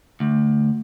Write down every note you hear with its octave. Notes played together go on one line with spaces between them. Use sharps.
D2